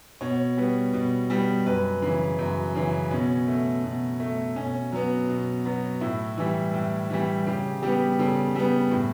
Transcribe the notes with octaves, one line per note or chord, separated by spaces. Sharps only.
B2 C#5
G3 B3
B2
G3 B3
F#2 B4
C#3 E3
F#2
C#3 E3
B2 C#4
A3
B2
A3
B2 C#4
F#3 B3
B2
F#3 B3
A2 E4
E3 G3
A2
E3 G3
C#3 G4
G3 B3 G4
C#3 A4
G3 B3
A2